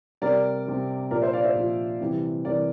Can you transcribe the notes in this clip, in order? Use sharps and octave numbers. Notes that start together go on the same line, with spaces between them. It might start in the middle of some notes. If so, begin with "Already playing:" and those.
C3 G3 A#4 D5
C3 G3
A#2 F3 A#4 D5
C5 E5
D5 F5
C5 E5
A#2 F3
C3 E3 G3
C3 E3 G3 A#4 D5